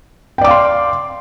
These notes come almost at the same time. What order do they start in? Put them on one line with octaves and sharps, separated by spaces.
G5 D5 D6 F5 C6